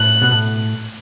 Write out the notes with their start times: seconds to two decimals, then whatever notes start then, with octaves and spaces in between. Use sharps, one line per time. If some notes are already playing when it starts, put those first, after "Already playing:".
Already playing: A2 F#6
0.22 B2
0.31 A2